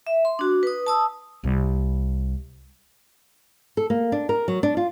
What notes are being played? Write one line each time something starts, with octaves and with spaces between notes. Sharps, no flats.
E5
C6
D4 F#4
B4 D#6
A5 D#6 E6
C2
A4
A#3
D4
A#4
F#3
D4
F4